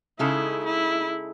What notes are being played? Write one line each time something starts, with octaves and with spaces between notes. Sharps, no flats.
C#3 G#3 D#4 E4 A4
E4